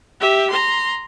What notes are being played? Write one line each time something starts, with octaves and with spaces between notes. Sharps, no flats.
G4 E5
A#5 C6